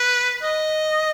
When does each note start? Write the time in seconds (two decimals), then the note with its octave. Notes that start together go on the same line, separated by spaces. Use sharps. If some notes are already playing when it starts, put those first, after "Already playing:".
Already playing: B4
0.43 D#5